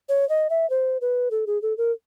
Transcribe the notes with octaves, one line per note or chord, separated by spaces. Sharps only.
C#5
D#5
E5
C5
B4
A4
G#4
A4
A#4